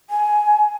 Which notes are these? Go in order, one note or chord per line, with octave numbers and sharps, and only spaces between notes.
G#5